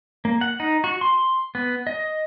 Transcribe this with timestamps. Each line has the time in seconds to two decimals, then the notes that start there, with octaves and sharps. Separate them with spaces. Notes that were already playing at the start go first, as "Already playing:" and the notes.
0.25 A#3
0.41 F#5
0.60 D#4
0.84 F#4
1.01 C6
1.55 B3
1.87 D#5